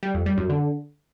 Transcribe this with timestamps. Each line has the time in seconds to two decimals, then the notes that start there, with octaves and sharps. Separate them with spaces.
0.03 G3
0.14 F2
0.26 G3
0.38 F#2
0.49 D3